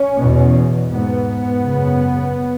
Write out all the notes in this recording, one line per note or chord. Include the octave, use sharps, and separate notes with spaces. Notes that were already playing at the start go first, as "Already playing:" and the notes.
Already playing: C#4
E2 B2
G#2 B3
F#2 C#3